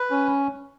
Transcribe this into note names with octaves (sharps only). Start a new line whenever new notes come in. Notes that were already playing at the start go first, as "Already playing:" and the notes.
Already playing: B4
C#4